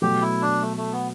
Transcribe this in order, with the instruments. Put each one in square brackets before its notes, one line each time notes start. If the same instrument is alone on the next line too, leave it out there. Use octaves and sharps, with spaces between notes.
[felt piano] B2 F#3 A3 [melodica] G4
[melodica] E4
D4
A3
A3
B3